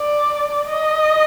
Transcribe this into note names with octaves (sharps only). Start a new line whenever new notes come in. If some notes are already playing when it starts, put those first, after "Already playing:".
Already playing: D5
D#5